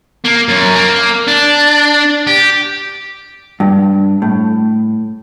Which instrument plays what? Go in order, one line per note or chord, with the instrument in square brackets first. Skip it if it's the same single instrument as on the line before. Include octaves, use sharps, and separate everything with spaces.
[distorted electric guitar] A#3
F#2
A#3
D4
G4
[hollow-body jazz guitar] G2
A2